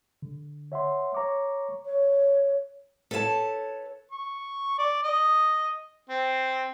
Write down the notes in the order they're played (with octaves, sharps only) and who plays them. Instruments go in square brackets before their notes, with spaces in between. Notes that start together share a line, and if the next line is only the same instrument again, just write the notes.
[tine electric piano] D3
C#5 E5 F#5 C6
C#5 A#5 C#6 D6
[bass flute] C#5
[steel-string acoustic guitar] A4 B4 C#5 F5 A5
[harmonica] C#6
D5
D#5
C4